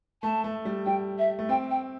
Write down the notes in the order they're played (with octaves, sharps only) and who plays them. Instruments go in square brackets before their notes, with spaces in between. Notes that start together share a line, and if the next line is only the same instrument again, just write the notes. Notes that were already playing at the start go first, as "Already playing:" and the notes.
[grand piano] A3 [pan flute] A5
[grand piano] A3
G3
[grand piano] G3 [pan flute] G5
[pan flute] E5
[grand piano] A3
[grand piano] C4 [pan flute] G5
[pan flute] G5